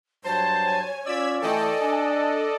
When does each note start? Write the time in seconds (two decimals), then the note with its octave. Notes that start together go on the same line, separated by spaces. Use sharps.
0.24 G2 F#3 C5 C#5 A5
0.67 G#5
1.06 C#4 F4 D5 E6 G#6 B6
1.42 E3 A3 A4 D5 D#5 G5 G#5
1.81 D4